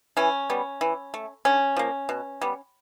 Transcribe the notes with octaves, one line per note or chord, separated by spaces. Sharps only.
E3 C#4
G3 B3
E3
A3
D3 C#4
F3 A#3
B2
G3 B3